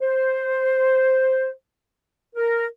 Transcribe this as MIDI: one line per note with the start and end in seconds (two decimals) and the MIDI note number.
0.01 1.51 72
2.36 2.65 70